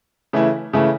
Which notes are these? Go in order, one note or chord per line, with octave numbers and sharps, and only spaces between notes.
C#3 E3 A3 E4
C#3 E3 A3 E4